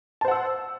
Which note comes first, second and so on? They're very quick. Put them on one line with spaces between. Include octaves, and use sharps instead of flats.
A5 C5 F#5 E6